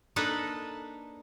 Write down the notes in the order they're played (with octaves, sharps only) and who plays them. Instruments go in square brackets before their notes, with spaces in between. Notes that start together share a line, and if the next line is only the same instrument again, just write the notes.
[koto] A#3 D4 D#4 A4 B4